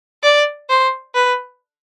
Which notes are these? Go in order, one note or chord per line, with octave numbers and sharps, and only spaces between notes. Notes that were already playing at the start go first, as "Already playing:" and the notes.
D5
C5
B4